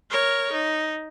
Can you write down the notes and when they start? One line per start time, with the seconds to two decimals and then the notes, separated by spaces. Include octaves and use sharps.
0.10 A#4 C#5
0.52 D#4